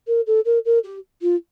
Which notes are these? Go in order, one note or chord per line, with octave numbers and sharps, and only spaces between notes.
A#4
A4
A#4
A#4
G4
F4